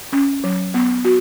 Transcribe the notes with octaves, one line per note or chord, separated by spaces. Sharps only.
C#4
F#3
B3
F#4